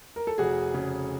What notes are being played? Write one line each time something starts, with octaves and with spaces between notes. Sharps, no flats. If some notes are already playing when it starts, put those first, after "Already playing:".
A#4
A4
F1 F#4 G#4
C#3